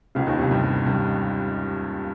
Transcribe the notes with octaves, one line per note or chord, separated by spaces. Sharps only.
C#2 C#3
D#2 D#3
C2 C3
G2
G2